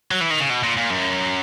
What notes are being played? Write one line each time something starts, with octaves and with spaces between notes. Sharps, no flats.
F#3
E3
D#3
C#3
B2
A#2
A#2
F#2